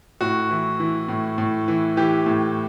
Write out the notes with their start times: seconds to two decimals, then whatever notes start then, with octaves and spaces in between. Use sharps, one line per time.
0.21 A2 F#4
0.50 E3
0.80 E3
1.08 A2
1.38 A2
1.68 E3
1.97 E3 G4
2.26 A2